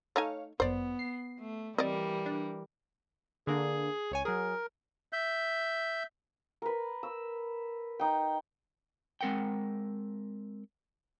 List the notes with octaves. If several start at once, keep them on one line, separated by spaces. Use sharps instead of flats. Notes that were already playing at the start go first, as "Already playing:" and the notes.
A3 D#4 C#5 F5 G#5
G1 F#2 B3 C5 D5
C7
A3
E3 G3 C4 A#4 D5 D#5
D4
D3 A#3 D4 G#4
C#2 C#5 G#5
F#3 G#4 A#4
E5 G6
A#4 B4
E6
D#4 G5
G#3 C4 A#4 F#5 G5